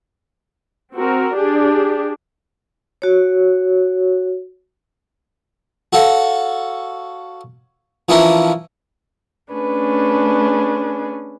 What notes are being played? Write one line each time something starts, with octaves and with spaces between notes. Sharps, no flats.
C4 F#4 A#4
D4 G4 G#4
F#4 C#5
F#4 A4 C#5 F5
E3 F3 C#4 D4 E4 A#4
A3 C#4 D4 G#4 B4